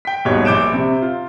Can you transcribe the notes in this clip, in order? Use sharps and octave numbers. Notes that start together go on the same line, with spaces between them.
G5 B6
D#1 G#2 B2 C#5
A#1 D6 G6 D7 E7
C3
F4